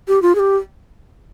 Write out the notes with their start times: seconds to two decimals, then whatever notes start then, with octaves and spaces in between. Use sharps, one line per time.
0.08 G4
0.22 F4
0.35 G#4
0.39 G4